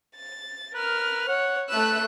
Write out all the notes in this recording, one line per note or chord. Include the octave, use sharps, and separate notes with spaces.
A6
A#4 B4 F6
C#5 F#5
A3 B4 E6 F#6